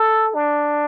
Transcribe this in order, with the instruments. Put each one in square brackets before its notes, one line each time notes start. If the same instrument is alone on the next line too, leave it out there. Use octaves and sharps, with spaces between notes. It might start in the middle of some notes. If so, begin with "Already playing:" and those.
Already playing: [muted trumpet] A4
D4